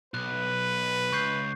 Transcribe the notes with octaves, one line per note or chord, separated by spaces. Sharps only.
B1 B4 F#6
C#2 C#6 G6 C7